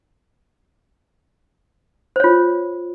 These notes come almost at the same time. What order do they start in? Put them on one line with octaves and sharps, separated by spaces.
C5 C#5 F4